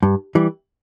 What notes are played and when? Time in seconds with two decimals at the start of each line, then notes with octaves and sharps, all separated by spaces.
0.03 G2
0.35 E3 G3